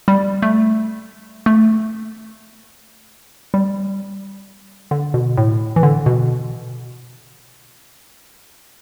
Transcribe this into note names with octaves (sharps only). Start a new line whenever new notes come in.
G3
A3
A3
G3
D3
B2
A2
E3
D3
B2